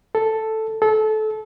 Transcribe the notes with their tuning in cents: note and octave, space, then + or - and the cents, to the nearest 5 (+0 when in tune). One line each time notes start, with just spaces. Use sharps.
A4 +0
A4 -25